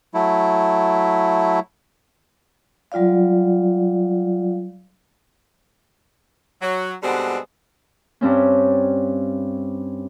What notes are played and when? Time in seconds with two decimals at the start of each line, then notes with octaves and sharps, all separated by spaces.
0.14 F#3 A3 E4
2.92 F#3 G3 F4 D5 F5
6.62 F#3
7.03 B2 D3 G3 G#3 B3 C4
8.21 G2 G3 C4 C#4